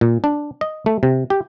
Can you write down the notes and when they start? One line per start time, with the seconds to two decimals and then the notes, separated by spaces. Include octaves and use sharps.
0.01 A#2
0.24 D4
0.61 D#5
0.86 A3
1.03 C3
1.30 G4